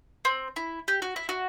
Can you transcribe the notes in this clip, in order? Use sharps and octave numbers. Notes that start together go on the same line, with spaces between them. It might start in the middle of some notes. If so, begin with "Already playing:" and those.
C4
E4
G4
F#4
E4
F#4